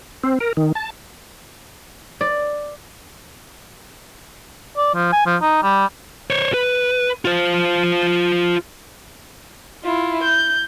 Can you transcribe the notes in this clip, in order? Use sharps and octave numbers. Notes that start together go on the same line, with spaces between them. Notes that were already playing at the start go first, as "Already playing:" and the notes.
C4
A#4
D#3
A5
D5
D5
F3
G#5
F3
D#4
G3
C5 C#5
B4
F4 C5
E4 F4
G6